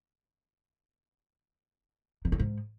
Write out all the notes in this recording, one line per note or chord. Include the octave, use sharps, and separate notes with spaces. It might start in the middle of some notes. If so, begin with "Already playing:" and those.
D#3
D3
G#2